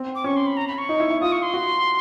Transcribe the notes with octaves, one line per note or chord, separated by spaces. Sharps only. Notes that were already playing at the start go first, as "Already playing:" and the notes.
Already playing: C4
D6
C#4 C#6
C6
B5
A#5
B5
C#6
D#4
E4
E4
F4 D#6
C#6
C6
F#4